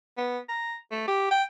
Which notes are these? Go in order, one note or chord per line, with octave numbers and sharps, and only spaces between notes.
B3
A#5
A3
G4
G5